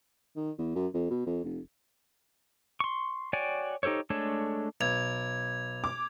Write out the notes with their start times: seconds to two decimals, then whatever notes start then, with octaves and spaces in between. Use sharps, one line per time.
0.36 D#3
0.58 E2
0.75 F#2
0.94 F2
1.10 B2
1.26 F2
1.44 F1
2.80 C6 C#6
3.33 F#4 C#5 D5 G5 G#5
3.83 D#4 G4 A4 C5 C#5
4.10 G#3 A3 D4 A4 C#5
4.81 B1 G#6 F7
5.84 D6